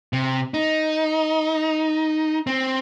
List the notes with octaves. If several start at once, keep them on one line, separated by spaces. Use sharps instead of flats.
C3
D#4
C4